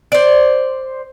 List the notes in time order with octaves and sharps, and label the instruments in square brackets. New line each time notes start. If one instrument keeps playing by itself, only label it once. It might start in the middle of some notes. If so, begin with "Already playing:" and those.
[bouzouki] C5 D5